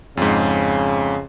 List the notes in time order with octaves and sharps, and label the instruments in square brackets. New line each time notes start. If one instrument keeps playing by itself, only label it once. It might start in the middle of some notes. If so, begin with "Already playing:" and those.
[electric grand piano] F2 G#2 [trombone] C#3